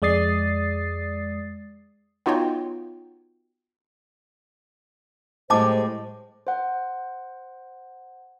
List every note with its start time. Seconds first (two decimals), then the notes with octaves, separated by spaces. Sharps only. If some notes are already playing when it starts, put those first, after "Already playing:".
0.02 F2 G#3 D5 D#6 A6 C7
2.26 B3 D#4 F4 F#4 C#5 G5
5.50 A2 G#3 G4 C5 D#5 A5 D6
6.47 C5 F#5